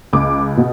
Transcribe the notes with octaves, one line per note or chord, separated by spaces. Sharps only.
C#2 D6
B2